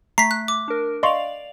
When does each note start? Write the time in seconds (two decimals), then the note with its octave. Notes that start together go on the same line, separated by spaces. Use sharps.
0.18 A3 A#5 B6 C7
0.31 F#6
0.48 D6
0.68 D4 A#4
1.03 D5 D#5 F5 C6 C#6 F7